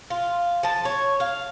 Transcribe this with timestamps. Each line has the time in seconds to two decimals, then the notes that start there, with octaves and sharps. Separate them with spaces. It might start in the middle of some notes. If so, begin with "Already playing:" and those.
0.10 F4
0.63 F3 A5
0.85 C#5
1.20 F5